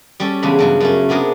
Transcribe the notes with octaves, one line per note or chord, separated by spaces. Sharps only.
G3 C#4 A4
E2 C#3 G#3 D4 B5
G2 C#3 F#3
F#2 A3 C#4
C3 B3 D4 G#4 A#4